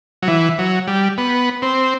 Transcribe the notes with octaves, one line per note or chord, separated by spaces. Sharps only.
F#3
E3
F#3
G3
B3
C4